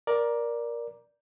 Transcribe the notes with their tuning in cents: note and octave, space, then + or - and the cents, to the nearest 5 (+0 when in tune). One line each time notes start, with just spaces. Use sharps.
A#4 +15 D5 +0